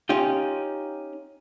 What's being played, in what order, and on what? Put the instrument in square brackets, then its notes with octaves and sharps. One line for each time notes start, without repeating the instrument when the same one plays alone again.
[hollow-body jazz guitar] C#4 D#4 F4 G4